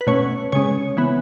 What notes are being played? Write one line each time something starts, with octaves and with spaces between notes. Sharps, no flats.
B4
B2 A3 C#4 C#5
C#3 G#3 C#4 C#5
C#3 E3 B3